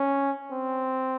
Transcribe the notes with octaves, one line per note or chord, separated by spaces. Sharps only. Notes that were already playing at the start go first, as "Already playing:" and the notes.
Already playing: C#4
C4